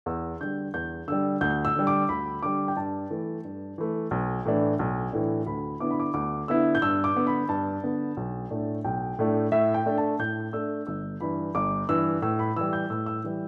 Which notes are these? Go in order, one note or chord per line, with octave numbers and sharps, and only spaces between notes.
E2 E6
D3 G3 G6
E2 G6
D3 G3 E6
D2 G6
E6
D3 G3
D6
D2 B5
D3 G3 D6
G5
G2 A5
E3 A3
G2
E3 A3
B1
A2 E3 A3 D4
B1
A2 E3 A3 D4
D2 B5
D3 B3 E4 D6
B5
D6
D2 D6
D3 B3 E4 E6
G6
G2 E6
D6
D3 B3
B5
G2 A5
D3 B3
B1
A2 A3 D4
B1 G5
A2 A3 D4
A2 E5
G5
A3 D4
A5
A2 G6
A3 D4 E6
G1 E6
G2 E3 B5
G1 D6
G2 E3 E6
A2 E6
B5
E3 G3 E6
G6
A2 E6
E6
E3 G3